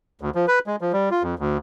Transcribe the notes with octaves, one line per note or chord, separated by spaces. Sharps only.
D2
F3
B4
G#3
F3
G3
F4
F2
D2